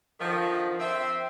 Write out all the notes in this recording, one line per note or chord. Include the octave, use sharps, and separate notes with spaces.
D3 D#3 F3
C4 E5